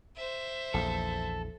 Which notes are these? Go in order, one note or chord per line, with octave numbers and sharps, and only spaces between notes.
C5 E5
A#1 E2 A4